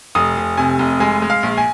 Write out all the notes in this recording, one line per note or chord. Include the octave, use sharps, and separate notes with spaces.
F1 D#6
F1
C3 G#5
F1
G#3 G#5
G#3
F5
A#1
G#5